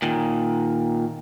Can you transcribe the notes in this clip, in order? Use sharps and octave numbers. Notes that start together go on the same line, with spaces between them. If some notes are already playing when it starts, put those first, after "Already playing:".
A#2 D#3